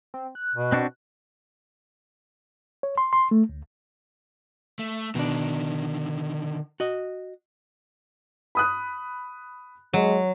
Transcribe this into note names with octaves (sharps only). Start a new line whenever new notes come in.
C4
F#6
B2
C4 D4 F#4
C#5
C6
C6
A3
D2
A3
B2 D3 D#3 D4
F#4 D#5
B5 D#6 F#6
F#3 G#3